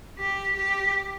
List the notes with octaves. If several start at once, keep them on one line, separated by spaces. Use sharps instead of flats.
G4
G4